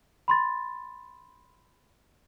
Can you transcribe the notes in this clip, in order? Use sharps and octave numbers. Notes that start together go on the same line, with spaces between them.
B5 C6 A6